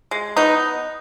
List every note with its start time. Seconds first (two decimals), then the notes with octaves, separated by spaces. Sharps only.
0.11 G#3
0.36 B3 D#4